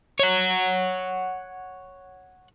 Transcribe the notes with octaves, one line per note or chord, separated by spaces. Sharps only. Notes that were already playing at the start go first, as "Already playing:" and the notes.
C#5 F#5